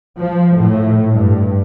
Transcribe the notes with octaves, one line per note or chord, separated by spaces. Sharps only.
F3
A2
G2